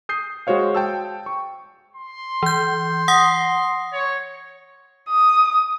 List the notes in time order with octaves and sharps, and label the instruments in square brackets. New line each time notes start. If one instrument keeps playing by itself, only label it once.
[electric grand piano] D#6 G6 C7
G#3 F#4 C5 C#5 F5
G5 A5 E6
C#6
[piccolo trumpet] C6
[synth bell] E3 G6
F#5 D#6 A#6
[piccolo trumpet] C#5
[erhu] D#6